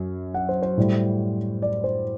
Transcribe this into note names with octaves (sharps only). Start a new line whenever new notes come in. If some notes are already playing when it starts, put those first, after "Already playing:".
Already playing: F#2 F#3
F#5
C5
C5
A2 G3
D5
C5